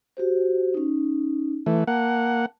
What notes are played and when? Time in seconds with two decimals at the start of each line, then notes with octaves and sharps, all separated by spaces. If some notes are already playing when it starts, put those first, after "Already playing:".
0.17 F#4 G4 C5
0.74 C#4 D#4
1.66 E3 A3
1.87 A#3 F#5 A5